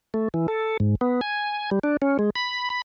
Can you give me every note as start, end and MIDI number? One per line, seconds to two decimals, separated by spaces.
0.14 0.28 57
0.34 0.47 52
0.48 0.77 69
0.80 0.95 44
1.01 1.21 59
1.21 1.70 80
1.71 1.79 55
1.83 1.97 62
2.02 2.17 61
2.19 2.30 56
2.36 2.70 83
2.70 2.82 83